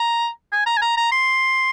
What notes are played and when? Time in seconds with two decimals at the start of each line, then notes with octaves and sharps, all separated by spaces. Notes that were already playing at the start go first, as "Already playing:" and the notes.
Already playing: A#5
0.52 G#5
0.66 A#5
0.77 G#5
0.82 A#5
0.97 A#5
1.12 C6